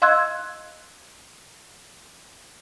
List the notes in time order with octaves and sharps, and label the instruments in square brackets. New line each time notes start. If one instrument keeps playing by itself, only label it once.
[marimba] D#5 F5 C6 E6 F#6 G#6